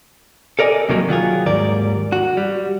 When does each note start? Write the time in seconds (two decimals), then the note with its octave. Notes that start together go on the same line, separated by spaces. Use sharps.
0.59 A4 A#4 D5 D#5 G#5
0.89 D#2 C3 D#3 F#3 G3 A#3
1.09 D#3 F#3 F4 G#4
1.46 D#2 G#2 G3 A#4 D5
2.12 F#4
2.37 G3